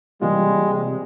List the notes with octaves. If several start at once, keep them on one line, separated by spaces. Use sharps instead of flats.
C3 E3 G3 G#3 A#3 F4